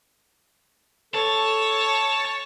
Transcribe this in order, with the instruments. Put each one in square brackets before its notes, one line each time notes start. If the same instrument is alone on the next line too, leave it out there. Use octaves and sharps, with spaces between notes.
[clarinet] A4 [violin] C#5 [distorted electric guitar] A5